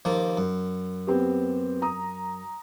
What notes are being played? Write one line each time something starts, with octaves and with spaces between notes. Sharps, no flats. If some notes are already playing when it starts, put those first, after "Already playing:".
D#2 F3 A#3
F#2
B3 C4 G4
A#5 D#6